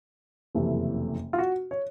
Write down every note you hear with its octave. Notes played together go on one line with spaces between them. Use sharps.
F#1 F2 C3 E3 A3
F4
F#4
C#5